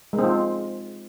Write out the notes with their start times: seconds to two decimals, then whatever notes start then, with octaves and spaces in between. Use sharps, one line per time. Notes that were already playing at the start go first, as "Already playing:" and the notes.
0.13 G#3
0.18 C4
0.24 F4